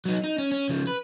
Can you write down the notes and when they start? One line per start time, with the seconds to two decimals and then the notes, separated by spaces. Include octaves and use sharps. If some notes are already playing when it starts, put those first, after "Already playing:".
0.05 F#3 D#4
0.24 D#4
0.38 C#4
0.52 C#4
0.69 C#3 F3
0.87 B4